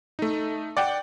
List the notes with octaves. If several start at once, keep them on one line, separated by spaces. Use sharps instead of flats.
A3 D#4
D5 F#5 G5